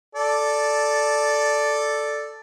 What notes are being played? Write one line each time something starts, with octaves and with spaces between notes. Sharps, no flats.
A4 D5